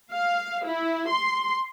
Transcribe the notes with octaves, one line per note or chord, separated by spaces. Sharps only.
F5
E4
C6